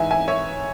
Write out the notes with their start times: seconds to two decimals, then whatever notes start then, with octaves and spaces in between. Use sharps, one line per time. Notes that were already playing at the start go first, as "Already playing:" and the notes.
Already playing: G#2 E3 E5 G#5
0.11 E5 G#5
0.28 C#5 E5